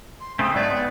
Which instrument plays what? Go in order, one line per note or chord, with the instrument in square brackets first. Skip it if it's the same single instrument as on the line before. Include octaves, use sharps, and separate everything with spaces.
[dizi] C6
[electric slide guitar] C#3 A3 C4 [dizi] D#6
[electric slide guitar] G#2 F#3 A3 [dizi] D5
[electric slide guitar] B3